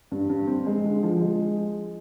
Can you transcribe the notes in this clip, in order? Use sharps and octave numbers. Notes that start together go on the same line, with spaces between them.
G2
G2
C4
G#3
D3
F3
G#3